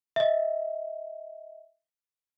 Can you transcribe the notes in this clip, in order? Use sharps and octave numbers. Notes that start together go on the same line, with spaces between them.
D#5 E5